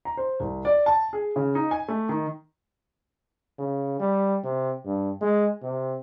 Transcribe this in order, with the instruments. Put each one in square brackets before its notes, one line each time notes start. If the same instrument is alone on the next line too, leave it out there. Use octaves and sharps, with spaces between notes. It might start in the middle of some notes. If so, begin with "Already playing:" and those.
[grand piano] A#5
C5
C2
D5
A5
G#4
C#3
D#4
G#5
A3
D#3
[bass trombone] C#3
G3
C3
G2
G#3
C3